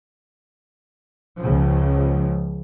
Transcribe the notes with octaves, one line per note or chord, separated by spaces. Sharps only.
C#2 C#3 F3